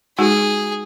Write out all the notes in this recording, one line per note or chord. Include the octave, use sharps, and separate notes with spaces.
G#3 D#4 F#4 G#4